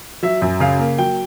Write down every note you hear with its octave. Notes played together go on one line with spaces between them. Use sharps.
F#3 E5
F#2
C#3 F5
A#3
F#3 G5